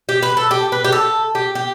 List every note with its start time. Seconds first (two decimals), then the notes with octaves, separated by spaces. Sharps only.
0.09 G4
0.23 B4
0.37 A4
0.51 G4
0.72 B4
0.84 G4
0.92 A4
1.35 G4
1.55 G4